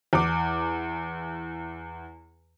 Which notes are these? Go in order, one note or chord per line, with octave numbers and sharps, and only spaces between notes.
E2 D6